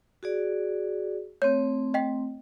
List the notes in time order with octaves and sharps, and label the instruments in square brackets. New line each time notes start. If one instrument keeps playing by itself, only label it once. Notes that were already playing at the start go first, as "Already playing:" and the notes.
[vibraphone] F#4 G#4 D5
[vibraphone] A3 C4 [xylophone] C#5 G6
[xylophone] D#5 G5 B6